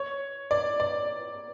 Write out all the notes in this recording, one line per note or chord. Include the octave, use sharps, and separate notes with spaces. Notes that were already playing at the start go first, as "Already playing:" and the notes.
Already playing: C#5
D5
D5